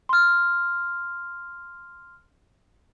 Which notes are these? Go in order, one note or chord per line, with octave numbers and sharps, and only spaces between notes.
C6 F6